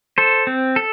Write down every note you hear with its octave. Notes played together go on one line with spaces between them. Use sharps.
A4 C5
C4
A4